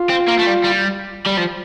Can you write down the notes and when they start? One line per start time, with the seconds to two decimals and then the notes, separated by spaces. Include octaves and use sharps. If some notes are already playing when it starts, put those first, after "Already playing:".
Already playing: F4
0.10 C4
0.28 A#3
0.39 A3
0.47 G3
0.65 G3
1.26 G3
1.38 F3